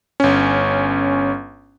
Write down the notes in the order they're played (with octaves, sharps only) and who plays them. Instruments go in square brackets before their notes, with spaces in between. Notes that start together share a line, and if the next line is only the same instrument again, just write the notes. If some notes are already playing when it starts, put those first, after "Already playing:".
[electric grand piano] G1 C#4